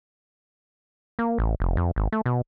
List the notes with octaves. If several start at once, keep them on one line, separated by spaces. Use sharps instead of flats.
A#3
A1
F1
F2
G#1
A3
B2